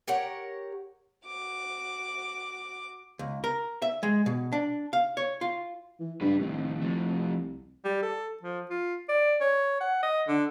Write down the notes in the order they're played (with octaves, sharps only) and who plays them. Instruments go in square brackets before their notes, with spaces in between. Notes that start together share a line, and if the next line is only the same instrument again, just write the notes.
[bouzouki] G4 A#4 C#5 F#5
[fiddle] F#4 D6
[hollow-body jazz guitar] C#2
A#4
E5
G#3
B2
D4
F5
C#5
F4
[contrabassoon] E3
[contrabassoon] G2 [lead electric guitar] C#3 B4
[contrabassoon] C2 [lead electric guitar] A2 D#3
[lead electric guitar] F3 A3
[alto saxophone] G3
A4
F3
F4
D5
C#5
F#5
D#5
D3